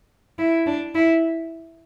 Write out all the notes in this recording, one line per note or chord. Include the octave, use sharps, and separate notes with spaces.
E4
D4
E4